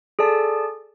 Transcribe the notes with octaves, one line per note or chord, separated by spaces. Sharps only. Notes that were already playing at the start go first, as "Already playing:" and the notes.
G#4 A4 D5 A5